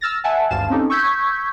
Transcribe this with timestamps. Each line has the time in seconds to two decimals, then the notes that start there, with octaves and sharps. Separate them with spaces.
0.01 E6 F6 A6 A#6
0.24 E5 F#5 G#5 A5
0.50 G#1 D2 G2 F5 A5 E7
0.69 C4 C#4 D#4 G4 A4
0.90 C#6 E6 G6 G#6 B6